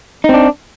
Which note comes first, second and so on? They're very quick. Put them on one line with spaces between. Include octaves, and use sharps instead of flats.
D#4 C4 D4